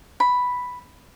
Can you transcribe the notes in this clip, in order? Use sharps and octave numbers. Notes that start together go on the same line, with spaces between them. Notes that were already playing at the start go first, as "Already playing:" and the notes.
B5